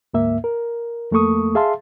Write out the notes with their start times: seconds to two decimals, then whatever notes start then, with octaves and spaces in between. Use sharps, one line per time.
0.14 D2 G#2 A#3 E5
0.44 A#4
1.11 F2 A3 A#3 A4 C#6 D#6
1.55 G#4 E5 F5 A5 C6